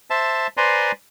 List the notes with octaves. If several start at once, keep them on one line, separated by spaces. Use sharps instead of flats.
C5 E5 A5
B4 C5 D5 G#5 A#5 C6